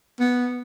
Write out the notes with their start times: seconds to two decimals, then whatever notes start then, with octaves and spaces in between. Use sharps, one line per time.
0.20 B3